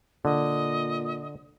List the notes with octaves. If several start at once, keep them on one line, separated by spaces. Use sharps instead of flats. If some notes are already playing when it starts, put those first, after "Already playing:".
A#2 D3 D#5